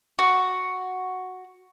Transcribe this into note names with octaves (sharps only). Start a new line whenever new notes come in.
F#4